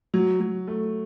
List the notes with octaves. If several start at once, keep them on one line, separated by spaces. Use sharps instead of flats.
F#3
F#3
A3